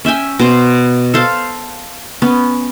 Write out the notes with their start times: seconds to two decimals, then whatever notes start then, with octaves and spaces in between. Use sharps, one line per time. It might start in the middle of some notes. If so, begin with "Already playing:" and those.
0.05 C#4 E5 G5 G#5
0.39 B2 C5
1.14 A4 C5 F5 A5
2.22 B3 C#4